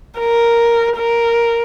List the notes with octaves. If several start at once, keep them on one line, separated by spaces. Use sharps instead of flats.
A#4
A#4